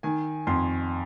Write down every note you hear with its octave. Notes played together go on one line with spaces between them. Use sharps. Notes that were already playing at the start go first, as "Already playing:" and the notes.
D#3 G#5
F2 C6